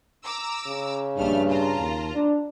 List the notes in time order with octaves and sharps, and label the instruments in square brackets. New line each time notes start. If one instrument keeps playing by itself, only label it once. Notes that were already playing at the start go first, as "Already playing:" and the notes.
[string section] A#5 D6 E6
[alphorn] C#3
[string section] A#1 A3 F6 [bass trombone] G2
[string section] F4 A5 A#5
[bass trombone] D#2
D4